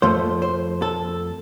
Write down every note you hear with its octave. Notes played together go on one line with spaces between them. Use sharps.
F2 F3 A3 C5
C5
A4